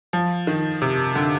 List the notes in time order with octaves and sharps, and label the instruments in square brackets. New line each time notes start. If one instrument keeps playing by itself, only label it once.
[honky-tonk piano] F3
D#3
C3
D3